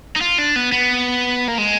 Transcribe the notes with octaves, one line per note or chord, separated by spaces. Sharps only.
D#4
F4
D4
B3
B3
A#3
G#3